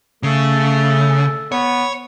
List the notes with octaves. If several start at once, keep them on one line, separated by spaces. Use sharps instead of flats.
C#3 A3 A4
B3 C#5